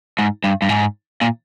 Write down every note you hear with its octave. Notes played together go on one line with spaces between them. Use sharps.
G#2
G2
G2
G#2
A#2